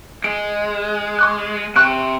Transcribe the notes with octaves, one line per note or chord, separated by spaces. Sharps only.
G#3 D7
C#6 D6 F#6
C3 C#6 F#6 D7